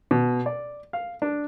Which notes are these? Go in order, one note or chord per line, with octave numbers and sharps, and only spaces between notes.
B2
D5
F5
D4